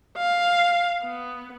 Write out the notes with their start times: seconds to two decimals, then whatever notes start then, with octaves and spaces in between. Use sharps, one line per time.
0.18 F5
1.03 B3